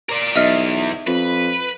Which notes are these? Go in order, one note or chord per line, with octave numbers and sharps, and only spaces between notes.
A#4 D5
B1 E2 D#5 E5 F6
F2 B4